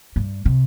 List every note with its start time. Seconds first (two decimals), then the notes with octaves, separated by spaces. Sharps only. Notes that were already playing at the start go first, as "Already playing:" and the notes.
0.16 G2
0.45 C3